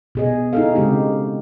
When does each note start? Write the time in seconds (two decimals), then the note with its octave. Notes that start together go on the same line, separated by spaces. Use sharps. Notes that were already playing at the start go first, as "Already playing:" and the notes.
0.15 B2 G#4 D#5
0.53 D#4 E4 F#4 G#4 A4 F5
0.75 C#3 G#3 C4 G4